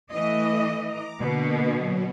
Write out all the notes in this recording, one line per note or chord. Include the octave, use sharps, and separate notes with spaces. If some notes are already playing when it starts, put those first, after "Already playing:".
E3 A3 D#5
A#5 D6
B2 D3 A#3
F#3